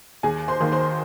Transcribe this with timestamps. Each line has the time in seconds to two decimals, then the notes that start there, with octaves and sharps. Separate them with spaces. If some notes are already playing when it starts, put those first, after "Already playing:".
0.23 D#2 G#4 G#5
0.48 C5 C6
0.60 D#3 A#3
0.72 C5 C6